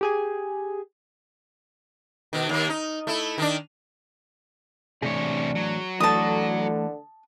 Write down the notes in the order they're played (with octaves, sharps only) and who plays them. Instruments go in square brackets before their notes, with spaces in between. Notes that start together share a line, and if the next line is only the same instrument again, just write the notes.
[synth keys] G4 G#4 G#5
[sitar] B2 D#3
D#2 A#3
D#4
A3 E4
D#3 D4
[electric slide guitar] E2 A2 G#4 [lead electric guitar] C3 C#5 [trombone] D4
[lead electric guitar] F#3
[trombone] D3 [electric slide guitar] E3 A3 [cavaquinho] A5 D#6